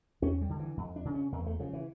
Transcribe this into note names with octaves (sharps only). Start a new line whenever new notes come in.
E2 C#4
G3
D3
E3
F2
D4
C#3
C#4
E2 A#3
A3
C#3 F3
E3